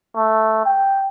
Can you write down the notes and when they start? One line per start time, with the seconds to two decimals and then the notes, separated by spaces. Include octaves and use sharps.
0.16 A3
0.65 G5